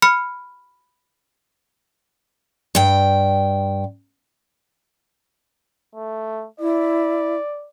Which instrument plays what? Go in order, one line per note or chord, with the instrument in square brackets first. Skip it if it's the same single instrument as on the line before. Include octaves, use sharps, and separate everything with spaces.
[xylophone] B5 F6 C#7
[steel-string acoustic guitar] G2 G5
[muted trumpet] A3
[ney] E4 [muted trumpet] D5